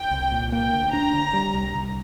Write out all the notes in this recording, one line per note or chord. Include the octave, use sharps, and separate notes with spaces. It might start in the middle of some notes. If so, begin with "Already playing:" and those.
Already playing: G5
C2
A#2
A#3 G5
D2
D4 A#5
D3
G3
C2
C2